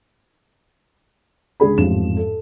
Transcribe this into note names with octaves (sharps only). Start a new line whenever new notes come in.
C#2 D3 G#4 B5
A1 F2 G#2 F3 E7
A4